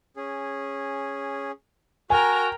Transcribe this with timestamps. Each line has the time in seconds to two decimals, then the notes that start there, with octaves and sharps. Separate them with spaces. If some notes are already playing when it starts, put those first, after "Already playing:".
0.17 C#4 G#4
2.10 F#4 A#4 G5 G#5 A#5